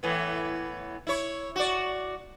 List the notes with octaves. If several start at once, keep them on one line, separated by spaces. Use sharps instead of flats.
A2 E3 B3
E4 C#5
F#4 D5